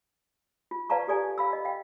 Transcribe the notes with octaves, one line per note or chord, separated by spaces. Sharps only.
F4
B4 D5 F5 A5 A#5 C#6
G4 A4 D5 G#5
F5 B5 E6
D#5
F5 G5